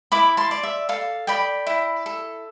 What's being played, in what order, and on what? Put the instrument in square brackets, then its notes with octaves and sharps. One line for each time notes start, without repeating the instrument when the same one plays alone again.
[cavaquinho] E4 B5 D6
A5 C6
D5
E5
A4 F5
D5 G5 B5
E4
A4